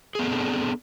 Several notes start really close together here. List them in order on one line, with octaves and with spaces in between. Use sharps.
G#4 B3 A4 C4 D4